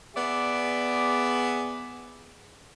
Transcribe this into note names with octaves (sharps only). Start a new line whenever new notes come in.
B3 G#4 D5 E5